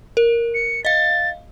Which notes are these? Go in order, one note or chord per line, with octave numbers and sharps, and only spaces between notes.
A#4
C#7
D#5 F5 A6